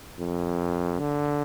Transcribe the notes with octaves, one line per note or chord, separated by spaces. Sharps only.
F2
D3